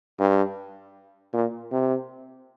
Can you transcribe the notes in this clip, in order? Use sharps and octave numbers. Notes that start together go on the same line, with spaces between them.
G2
A#2
C3